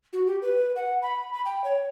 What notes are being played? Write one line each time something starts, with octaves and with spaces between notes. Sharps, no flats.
F#4
G4
B4
F#5
B5
B5
G5
C#5